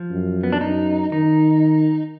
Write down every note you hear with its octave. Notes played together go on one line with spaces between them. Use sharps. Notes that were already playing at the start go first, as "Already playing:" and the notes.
Already playing: F3
F#2
B3
D4
F#2 D#4
D#3 D#4